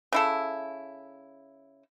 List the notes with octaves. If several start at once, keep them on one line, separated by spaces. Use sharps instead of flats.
C#3 E4 A4